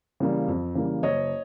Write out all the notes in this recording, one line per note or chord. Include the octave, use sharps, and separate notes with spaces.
C#3 E3 G3 A#3
F2
C#3 E3 G3 A#3
F#1 C#5 D#5